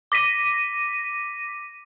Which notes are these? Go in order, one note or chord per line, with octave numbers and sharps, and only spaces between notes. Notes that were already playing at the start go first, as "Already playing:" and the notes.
D6 A#6 B6 D#7